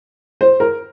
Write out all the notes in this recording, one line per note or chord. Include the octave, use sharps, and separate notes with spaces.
C5
A#4